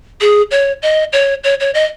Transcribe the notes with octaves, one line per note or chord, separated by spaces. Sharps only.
G#4
C#5
D#5
C#5
C#5
C#5
D#5